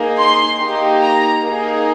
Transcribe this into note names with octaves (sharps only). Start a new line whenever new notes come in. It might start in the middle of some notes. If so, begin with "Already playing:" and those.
Already playing: A#3 D#4 G#4
C6
A#3 D#4 G4
A#5
A#3 D#4 G#4